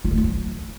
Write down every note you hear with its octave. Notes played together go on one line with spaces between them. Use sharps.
F4
A3
F4
F#3